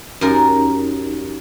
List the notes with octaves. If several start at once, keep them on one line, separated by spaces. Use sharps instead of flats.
F#2 D#4 G4 A#4